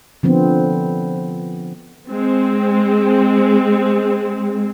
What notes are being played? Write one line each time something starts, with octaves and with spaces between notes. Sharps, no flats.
D3 F3 B3 C4
G#3 C4